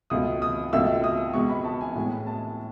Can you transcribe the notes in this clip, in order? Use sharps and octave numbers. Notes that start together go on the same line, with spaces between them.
C#2 B2 A3 D#6
D#6
C#2 B2 A3 E6
D#6
C#2 B2 G#3 B3 C#6
B5
A5
G#5
A2 G#3 B3 G#5
A5